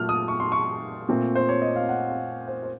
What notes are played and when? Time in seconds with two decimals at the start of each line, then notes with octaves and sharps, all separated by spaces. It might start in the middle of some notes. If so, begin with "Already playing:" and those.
Already playing: A#2 F#3 A3 F6
0.09 D#6
0.28 C#6
0.40 C6
0.52 C#6
1.09 A#2 A3 C4
1.35 C5
1.49 C#5
1.62 D#5
1.76 F5
1.89 F#5
2.08 F5
2.48 C5
2.63 C5